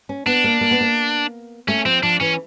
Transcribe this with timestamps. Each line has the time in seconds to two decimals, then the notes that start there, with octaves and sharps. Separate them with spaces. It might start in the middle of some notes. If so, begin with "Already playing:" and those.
0.09 C#4
0.26 B3 D4
0.44 A#3
0.61 A#3
0.71 B3
0.81 A#3
1.68 A3 C#4
1.85 F3 C4
2.03 F3 D4
2.20 E3 C#4